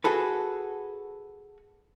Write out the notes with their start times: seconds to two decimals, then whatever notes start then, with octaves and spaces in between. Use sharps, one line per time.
0.04 F#4 G#4 A4 B4